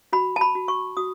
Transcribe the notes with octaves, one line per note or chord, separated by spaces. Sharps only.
F#4 B5
A5
B5
F#4
C#6
F#4 D#6